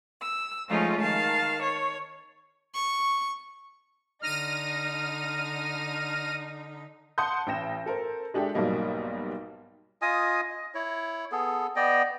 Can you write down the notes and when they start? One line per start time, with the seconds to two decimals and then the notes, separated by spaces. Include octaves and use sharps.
0.22 E6
0.68 F3 G#3 A3 C#4 D#4 F4
1.00 D#3 F5 A5
1.61 C#5
2.75 C#6
4.22 D3 D#4 F6 A#6 D#7
7.18 F#5 A5 C6 D#6 G6
7.47 A1 G5 A#6 E7
7.86 A4 A#4 C5
8.34 G#3 D4 G4 A4 E5
8.54 B1 G#2 F#3 G3 A#3 D#5
10.02 F4 D#5 G#5 D#6
10.50 D#5
10.74 E4 C#5
11.32 B3 G#4 A4
11.76 B3 D5 D#5 G5